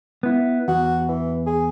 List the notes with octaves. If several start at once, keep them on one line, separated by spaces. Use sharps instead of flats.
B3 E4
E2 F#4
E3
G#4